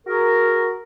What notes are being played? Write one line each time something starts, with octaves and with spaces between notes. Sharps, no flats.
F#4 G#4 A#4